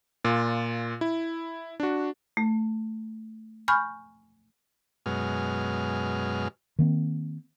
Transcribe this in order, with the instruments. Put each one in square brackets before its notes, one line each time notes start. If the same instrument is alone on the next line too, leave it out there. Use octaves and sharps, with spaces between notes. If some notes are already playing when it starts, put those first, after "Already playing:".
[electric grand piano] A#2 F4
E4
D4 F#4
[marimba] A3
G#5 B5 C#6 F6 G6
[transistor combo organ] F#2 B2 G#3 F6
[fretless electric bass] D#3 A#3 C4